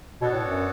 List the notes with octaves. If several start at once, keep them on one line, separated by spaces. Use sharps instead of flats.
B2 B3 D4 F#4 A4 C#5
A2
F#2